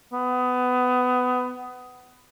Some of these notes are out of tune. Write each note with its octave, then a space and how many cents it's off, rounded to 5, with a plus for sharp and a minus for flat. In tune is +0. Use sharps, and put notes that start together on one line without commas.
B3 +20